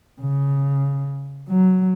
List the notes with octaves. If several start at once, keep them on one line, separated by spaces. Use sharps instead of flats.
C#3
F#3